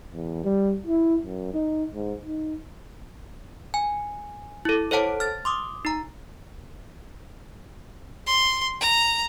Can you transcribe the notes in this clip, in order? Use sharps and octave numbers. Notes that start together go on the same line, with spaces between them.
E2
G3
E4
F#2
D#4
G#2
D#4
G#5
E4 A4
A4 C5 C#5 F#5 A5 D7
F6 A6
C6 D6 D#6
D#4 A#5
C6
A#5